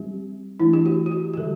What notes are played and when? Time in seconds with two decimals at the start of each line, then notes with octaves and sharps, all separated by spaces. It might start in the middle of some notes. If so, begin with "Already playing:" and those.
Already playing: G3 C4 G4
0.60 E3 A3 D4 E4
0.73 G4
0.86 F#4
1.06 F#4
1.11 G4
1.34 G4
1.37 D3 G3 A4